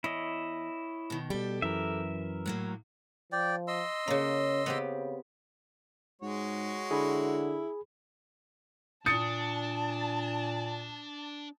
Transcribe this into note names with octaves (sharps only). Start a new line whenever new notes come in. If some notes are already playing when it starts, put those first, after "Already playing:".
E2 E4 C#5 D#5
B2 D#3
B2 G3 G4 A4
F#2 E3 A#4 E5
A2 F#3 A#3
F3 D5 G5
D#5 C6 E6
C#3 A#3 C#4
C#3 B3 C4 G4
G#2 G#3 F#4 C#5
D3 E4 G#4 B5
A#2 D4 A5 D#6 A6 C#7